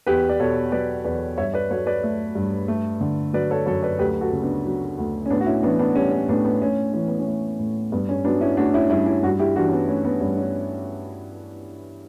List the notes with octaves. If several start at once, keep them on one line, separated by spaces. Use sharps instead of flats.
E2 G4 B4
D5
B2 A4 C#5
F#3 B4 D5
E2 B4 D5
G2 C#5 E5
B4 D5
F#3 A4 C#5
B4 D5
A3
G2
A3
D3
F#3 B4 D5
A4 C#5
F#2 A4 C#5
B4 D5
D2 G4 B4
F#4 A4
C#3
B3 D4
F#3
D2
C#4
A2 B3 D4
F#4
C#4 E4
E3 B3 D4
B3 D4
G3 C#4
C#4
A2 B3 D4
B3
A2 C#4
E3 C#4
B3
C#4
A3
A2
G2 B3
C#4
F#3 B3 D4
C#4 E4
A3 D4 F#4
C#4 E4
G2 C#4 E4
C#4 E4
G2 D4 F#4
E4 G4
E3 D4 F#4
C#4
B3 D4
A3 C#4
B3
G2 C#4
C#4